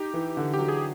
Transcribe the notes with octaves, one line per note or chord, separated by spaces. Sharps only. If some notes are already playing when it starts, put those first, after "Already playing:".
Already playing: D#4 G4
E3
D3
F#3 G4
G#4